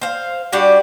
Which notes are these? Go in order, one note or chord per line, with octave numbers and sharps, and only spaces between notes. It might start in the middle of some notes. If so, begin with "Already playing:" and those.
C5 F5
G3 D4 F#4 G4